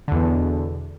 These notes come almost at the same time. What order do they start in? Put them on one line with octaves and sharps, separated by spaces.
D3 E2 B2